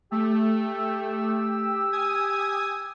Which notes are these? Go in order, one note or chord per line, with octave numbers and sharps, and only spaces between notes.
A3 G4 E6
G#5 D#6 G#6